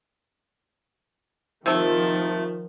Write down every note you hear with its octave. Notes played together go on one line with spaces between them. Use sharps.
C3 D#3 F3 A3